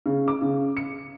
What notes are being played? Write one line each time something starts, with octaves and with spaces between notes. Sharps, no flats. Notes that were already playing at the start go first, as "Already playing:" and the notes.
C#3
D6
C#3
C#7